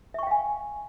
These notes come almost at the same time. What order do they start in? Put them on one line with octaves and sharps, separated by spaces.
E5 C#6 G5 F5 G#5